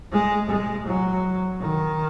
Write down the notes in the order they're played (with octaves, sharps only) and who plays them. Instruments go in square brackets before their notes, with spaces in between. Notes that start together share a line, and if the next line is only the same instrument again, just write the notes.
[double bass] G#3
G#3
F#3
D#3